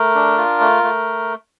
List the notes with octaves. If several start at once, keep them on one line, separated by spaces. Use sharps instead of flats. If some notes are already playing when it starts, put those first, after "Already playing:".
Already playing: A3 A#4
D4
F4
A3
A3